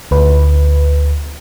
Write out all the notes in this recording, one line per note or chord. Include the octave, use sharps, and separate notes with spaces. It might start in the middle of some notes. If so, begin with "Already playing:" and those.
D2 B4